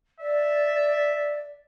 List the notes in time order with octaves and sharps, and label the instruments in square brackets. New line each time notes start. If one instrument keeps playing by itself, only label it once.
[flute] D5 [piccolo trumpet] E5